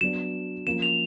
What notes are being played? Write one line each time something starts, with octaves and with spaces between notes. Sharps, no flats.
F#3 B3 D4 F#4 E7
F3 A#3 C#4 F4 E7
F7